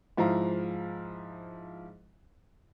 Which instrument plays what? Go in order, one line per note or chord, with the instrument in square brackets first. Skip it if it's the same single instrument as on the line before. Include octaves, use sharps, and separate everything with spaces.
[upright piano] G#2 F3 E4 F5 A#5